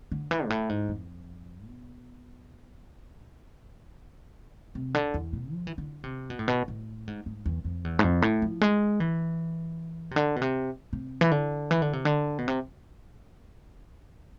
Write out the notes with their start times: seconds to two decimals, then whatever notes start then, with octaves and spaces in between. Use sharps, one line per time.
0.12 D3
0.31 E3
0.45 G#2
0.50 A2
0.69 G#2
0.89 F2
1.66 B2
4.75 C3
4.94 D3
5.14 E2
5.33 B2
5.52 F3
5.67 E3
5.78 D3
6.04 C3
6.30 B2
6.39 A2
6.48 B2
6.68 A2
7.07 G#2
7.26 G#2
7.46 E2
7.65 F2
7.84 E2
7.99 G#2
8.04 F2
8.22 A2
8.42 F3
8.61 G#3
9.00 E3
10.11 C3
10.16 D3
10.36 B2
10.42 C3
10.93 C3
11.21 E3
11.31 D3
11.71 E3
11.82 D3
11.93 C3
12.05 D3
12.38 B2
12.48 C3